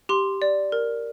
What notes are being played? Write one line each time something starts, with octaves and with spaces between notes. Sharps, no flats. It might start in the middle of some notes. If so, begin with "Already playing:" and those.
G4 C6
D5
A#4